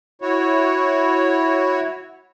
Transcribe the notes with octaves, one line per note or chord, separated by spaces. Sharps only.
E4 F#4 C#5